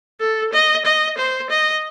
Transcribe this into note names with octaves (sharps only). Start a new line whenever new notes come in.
A4
D#5
D#5
C5
D#5